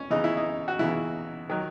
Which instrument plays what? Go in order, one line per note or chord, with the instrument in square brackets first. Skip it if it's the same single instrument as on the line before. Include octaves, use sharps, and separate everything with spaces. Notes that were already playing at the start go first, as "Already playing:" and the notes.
Already playing: [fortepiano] C#4
E2 C#3 E3 D#4
E4
D#4
F#4
E2 C#3 E3 E4
D#3 F#3